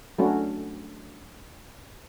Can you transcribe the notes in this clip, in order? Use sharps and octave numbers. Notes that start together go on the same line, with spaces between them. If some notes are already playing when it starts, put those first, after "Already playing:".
F#3 A3 C#4 D4 F#4